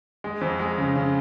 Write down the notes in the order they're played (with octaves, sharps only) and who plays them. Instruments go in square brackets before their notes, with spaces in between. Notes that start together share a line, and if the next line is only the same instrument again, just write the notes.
[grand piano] G#3
F2
G#3
C#3
C#3